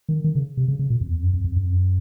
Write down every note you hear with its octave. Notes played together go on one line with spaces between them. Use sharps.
D#3
D#3
C#3
C3
C#3
C#3
A#2
F2
E2
F2
F#2
F2
F2
F#2
F2
F#2